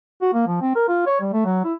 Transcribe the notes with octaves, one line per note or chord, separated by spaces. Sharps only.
F#4
A#3
F3
C4
A#4
F4
C#5
G3
A3
F#3
E4